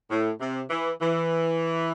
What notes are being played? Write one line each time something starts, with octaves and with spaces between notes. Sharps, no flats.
A2
C3
E3
E3